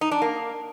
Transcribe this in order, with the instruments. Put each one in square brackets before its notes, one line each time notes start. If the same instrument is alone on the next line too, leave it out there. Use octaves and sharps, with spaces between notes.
[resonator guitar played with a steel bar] D#4
D4
A#3